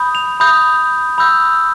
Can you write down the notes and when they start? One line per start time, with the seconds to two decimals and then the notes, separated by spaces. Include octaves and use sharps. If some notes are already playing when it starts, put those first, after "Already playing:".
Already playing: B5 D#6 G6
0.15 F7
0.40 B5 D#6 G6
1.18 B5 E6 G6